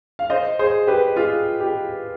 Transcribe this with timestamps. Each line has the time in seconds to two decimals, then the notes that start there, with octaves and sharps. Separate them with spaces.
0.19 F5
0.30 C5 D#5
0.59 G#4 C5
0.87 G4 B4
1.16 F4 G#4
1.60 G4